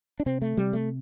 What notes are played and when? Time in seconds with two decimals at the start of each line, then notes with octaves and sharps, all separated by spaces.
0.20 D4
0.26 C3 C4
0.42 A3
0.57 C3 G3
0.73 A3